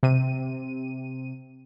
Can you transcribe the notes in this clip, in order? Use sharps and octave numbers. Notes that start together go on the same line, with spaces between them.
C3 D#7